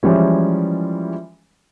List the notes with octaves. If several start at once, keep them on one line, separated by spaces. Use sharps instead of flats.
E3 F3 G3 G#3 C#4